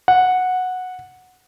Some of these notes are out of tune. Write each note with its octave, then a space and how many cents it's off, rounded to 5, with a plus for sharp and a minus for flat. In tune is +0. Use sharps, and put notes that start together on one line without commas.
F#5 -10